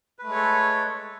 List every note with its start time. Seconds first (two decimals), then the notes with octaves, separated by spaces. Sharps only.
0.19 B4
0.23 A3
0.27 G#3
0.31 C#5
0.35 A4